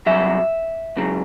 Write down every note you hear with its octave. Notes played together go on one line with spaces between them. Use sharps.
C2 B2 F#3 E5
C#2 C#3 F#3